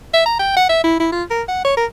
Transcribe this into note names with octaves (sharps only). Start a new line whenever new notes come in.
E5
A#5
G5
F#5
E5
E4
E4
F4
A#4
F#5
C#5
A#4